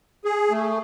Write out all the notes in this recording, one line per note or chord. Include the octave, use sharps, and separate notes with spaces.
G#4
A3